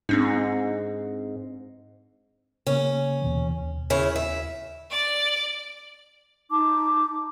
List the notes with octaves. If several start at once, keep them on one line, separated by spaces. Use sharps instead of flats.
G#2 C4 D4 D#4
C#3 A#3 C#4
D#2 B2 E3
D#2
C#3 E4 C#5
E5
D5 D7
D#4 A5 D6